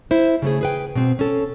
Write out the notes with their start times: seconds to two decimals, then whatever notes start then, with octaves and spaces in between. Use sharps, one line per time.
0.11 E4 C5
0.42 C#3 A3 G#4
0.61 G#4 B4 G5
0.95 B2 C4
1.19 C#4 A4